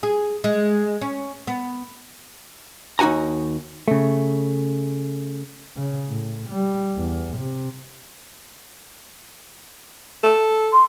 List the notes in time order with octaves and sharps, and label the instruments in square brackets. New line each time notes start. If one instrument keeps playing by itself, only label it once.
[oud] G#4
G#3
C#4
B3
[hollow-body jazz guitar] D#2 D#4 F#4 G#5 A#5
C#3 A3
[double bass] C#3
A2
G3
E2
C3
[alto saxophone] A4
[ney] C6